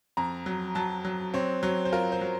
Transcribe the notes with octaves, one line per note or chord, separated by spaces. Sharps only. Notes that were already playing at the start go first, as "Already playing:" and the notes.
F2 A#5
F#3
F#3 A5
F#3
C4 C#5
F#3 C#5
C5
F4 A#4
C5
F#3